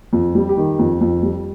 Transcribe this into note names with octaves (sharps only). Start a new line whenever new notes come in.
F2
G3
G4
D#3
F2
F2
G3